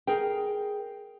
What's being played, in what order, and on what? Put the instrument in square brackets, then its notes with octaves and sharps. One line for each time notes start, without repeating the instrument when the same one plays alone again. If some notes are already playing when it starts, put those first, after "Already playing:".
[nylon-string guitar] G#4 A#4 G5